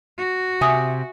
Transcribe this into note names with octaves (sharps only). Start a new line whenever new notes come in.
F#4
C3 E5 G#5 D#6